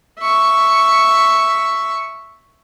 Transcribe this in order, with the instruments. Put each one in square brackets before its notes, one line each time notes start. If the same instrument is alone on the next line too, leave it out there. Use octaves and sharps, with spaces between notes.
[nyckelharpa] E5 C#6